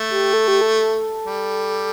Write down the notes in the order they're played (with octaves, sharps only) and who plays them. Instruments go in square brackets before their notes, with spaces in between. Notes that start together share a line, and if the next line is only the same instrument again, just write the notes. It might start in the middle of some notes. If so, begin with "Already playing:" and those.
Already playing: [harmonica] A3
[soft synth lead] G4
A4
G4
A4
[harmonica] G3